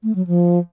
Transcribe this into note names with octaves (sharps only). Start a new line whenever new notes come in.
A3
F#3
F3